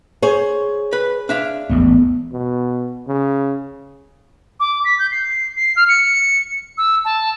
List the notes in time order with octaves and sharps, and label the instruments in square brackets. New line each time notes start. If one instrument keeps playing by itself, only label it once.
[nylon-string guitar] G#4 C5 C#5
[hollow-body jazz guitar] B4
D4 E5 F5
[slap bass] A1 E2 G#2 [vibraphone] B3
[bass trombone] B2
C#3
[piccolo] D6
B6
G6
C7
C7
F6
C#7
E6
A5